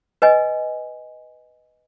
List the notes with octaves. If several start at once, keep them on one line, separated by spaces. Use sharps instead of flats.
B4 D#5 G#5